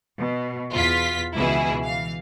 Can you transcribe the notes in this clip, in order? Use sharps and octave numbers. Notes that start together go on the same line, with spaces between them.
B2
E2 F4 B6
C#2 B2 E3 E4 G#4
E3 F5